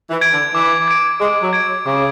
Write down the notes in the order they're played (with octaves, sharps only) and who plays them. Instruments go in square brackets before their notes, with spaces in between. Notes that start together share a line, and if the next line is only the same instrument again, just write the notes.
[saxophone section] E3
[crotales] G#6 D7
[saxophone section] D3
[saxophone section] E3 [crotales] D6
[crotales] G#6 D7
[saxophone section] G#3 [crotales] D6
[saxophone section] F#3
[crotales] G#6 D7
[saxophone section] C#3 [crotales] D6